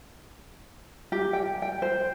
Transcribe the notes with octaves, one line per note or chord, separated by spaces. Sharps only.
G4
G5
G5
C5